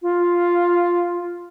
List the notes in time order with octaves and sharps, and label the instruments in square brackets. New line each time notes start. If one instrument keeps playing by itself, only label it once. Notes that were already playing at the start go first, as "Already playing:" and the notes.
[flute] F4